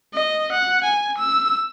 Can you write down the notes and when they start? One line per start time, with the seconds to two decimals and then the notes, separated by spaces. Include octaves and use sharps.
0.13 D#5
0.52 F#5
0.84 G#5
1.18 E6